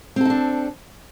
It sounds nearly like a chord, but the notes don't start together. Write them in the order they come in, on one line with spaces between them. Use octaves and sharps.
C4 A4 D#4 D4